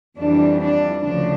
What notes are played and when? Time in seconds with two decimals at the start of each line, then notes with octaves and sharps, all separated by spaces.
0.18 F2 E3 G3 D4
0.62 D4
1.05 D2 C#3 F3 D4